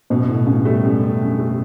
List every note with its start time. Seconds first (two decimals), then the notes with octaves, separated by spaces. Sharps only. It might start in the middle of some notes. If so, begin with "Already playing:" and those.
0.10 F#2 B2
0.28 A2 D3
0.46 F#2 C#3
0.65 G3 A3
0.84 F#2
1.03 D3
1.21 F#2
1.39 A3